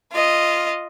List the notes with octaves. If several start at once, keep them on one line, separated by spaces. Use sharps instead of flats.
F4 D#5